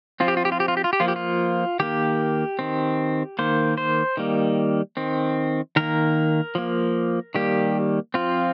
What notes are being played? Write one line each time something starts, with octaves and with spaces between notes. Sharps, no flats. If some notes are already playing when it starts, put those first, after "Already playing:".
F3 C4 F4
G4
F4
G4
F4
G4
F4
G4
F4
G4
F3 A#3 F4
G4
F4
D#3 A#3 G4
D#3 C4
D#3 A#3 C5
C5
D#3 G3 A#3
D#3 C4
D#3 A#3 A#4
F3 A#3
D#3 G3 A#3 G4
F3 C4 F4